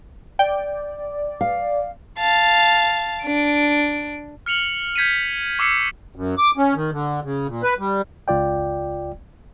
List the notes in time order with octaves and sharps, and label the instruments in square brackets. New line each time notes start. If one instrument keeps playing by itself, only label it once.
[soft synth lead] D5 [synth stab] G5
[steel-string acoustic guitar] F5
[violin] F5 A5
D4 D7
[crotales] F6 C#7 F7 F#7
G6 G#6 B6 C#7 D#7
C#6 D6 E6 C7 C#7
[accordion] F#2
D6
C#4
D#3
D3
C#3
A#2
B4
G3
[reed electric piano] C#2 F4 D5 G5